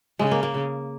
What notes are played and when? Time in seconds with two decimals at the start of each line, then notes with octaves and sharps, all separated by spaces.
0.19 C#3 G#3
0.31 A#3
0.43 A#3